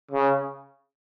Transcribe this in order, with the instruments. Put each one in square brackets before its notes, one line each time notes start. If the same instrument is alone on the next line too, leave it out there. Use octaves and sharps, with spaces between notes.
[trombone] C#3